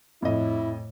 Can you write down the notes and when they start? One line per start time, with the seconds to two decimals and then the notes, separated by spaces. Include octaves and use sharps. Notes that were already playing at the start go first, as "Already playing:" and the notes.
0.23 F2 A2 E4 D#5